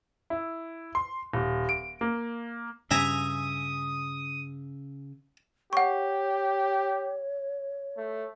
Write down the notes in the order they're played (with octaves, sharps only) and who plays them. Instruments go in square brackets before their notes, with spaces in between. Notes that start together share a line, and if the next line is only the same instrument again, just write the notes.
[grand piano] E4
C6
D#1
D7
A#3
[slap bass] G2 [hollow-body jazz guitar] C#3 [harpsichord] E5 G#5 A#5 [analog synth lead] D#6
[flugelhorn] G4 [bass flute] C#5 [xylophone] F#5 C#6
[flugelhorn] A3